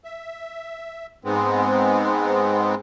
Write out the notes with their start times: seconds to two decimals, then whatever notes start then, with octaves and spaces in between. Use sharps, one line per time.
0.04 E5
1.24 G#2 G#3 B3 C4